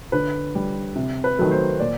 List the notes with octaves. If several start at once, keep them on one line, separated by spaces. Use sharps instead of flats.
D3 B4
G3
C3
B4
D#3 F#3 A3
C5
A#2 D5